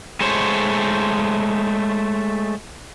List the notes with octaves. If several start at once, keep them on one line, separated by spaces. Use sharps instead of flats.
G#3 A3 C5 C#5